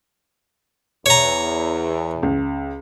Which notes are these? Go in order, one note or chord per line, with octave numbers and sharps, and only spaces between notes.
E2 C#5 A#5
C#2